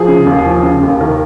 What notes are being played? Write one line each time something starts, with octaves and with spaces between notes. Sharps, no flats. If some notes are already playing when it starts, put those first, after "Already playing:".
Already playing: F3 G#4
C#3
D#2
F3
C#3
D#2
D#3 A#4